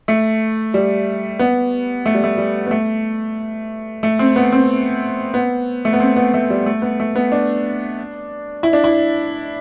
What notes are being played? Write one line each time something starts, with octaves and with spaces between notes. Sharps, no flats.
A3
G3
B3
A3
G3
A3
G3
B3
A3
A3
C4
B3
C4
B3
A3
B3
C4
B3
A3
G3
A3
B3
A3
B3
D4
E4
D4
E4